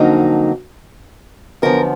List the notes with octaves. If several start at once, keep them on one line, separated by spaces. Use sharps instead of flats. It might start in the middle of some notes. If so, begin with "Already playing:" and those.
Already playing: F2 D3 F#3 A#3 D#4
F#2 D3 F3 B3 A#4